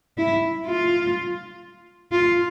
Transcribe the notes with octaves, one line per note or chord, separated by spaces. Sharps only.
E4
F4
F4